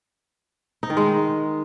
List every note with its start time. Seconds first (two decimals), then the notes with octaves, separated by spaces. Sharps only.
0.83 D#4
0.90 D#3
0.97 G#3